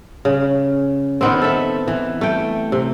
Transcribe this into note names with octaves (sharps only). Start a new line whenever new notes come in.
C#3
D#3 B3 C4
A4 E5
E3
A3 G5
C3